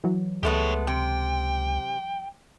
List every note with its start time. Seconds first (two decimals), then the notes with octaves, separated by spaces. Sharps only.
0.04 E3 F#3
0.43 C#2 G#3 A3 B3 G4 C#5
0.87 C3 G5